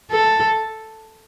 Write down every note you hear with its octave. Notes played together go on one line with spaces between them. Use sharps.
A4